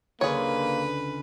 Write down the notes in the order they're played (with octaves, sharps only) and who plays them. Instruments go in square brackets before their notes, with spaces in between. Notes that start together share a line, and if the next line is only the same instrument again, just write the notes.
[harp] C#2 D3 [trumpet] A#3 [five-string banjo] G#4 C#5 [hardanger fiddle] B4